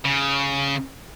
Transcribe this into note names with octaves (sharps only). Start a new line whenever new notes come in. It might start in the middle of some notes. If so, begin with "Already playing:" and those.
C#3